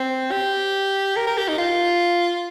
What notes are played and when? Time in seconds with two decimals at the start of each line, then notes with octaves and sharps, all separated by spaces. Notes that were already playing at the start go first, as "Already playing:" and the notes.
Already playing: C4
0.32 G4
1.16 A#4
1.27 A#4
1.37 G4
1.48 D#4
1.58 F4